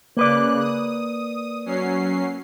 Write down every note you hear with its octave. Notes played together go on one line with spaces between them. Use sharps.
C#3 A#3 B4 D5 F#6
D#6
F#3 C#4 C7